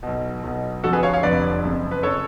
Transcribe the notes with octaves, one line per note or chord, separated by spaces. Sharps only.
B1 B2
B1 B2
F1 F2 D3 F#4 A4
G#4 B4
C#5 F5
C#5 F5
F1 F2 D3 B4 D5
F#1 F2 C#3
B4
C#3 A4 C#5